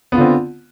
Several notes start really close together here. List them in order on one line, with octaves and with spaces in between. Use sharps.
B3 F4 D3 C4